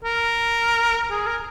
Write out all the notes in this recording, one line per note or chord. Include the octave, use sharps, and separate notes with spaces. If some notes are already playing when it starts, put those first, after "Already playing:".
A#4
G#4
A#4